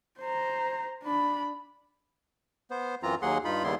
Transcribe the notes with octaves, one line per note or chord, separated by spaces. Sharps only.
C5 A#5
D4 B5
B3 C5
F#2 E3 C4 F4 A#5
D#2 F#3 A#3 G#4 F#5 C6
G2 D#4 F4 B5
D#2 C#3 G3 B3 E4 C6